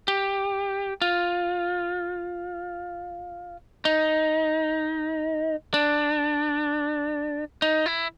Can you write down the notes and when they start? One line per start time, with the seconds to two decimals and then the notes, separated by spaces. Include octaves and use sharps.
0.08 G4
1.02 F4
3.85 D#4
5.74 D4
7.62 D#4
7.86 E4